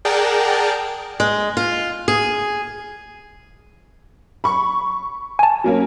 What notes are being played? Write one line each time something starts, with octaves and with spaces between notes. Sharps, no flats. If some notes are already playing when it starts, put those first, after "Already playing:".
G#4 A#4 D5 F#5 G5 A5
G#3
F4
G#4
B5 C#6
G#5 A5
F#3 A#3 C#4